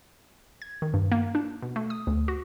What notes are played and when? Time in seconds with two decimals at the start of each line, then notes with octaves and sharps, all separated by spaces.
0.62 G#6
0.82 D#3
0.94 G2
1.12 A#3
1.35 D4
1.62 B2
1.76 A3
1.90 D#6
2.07 D2
2.28 F#4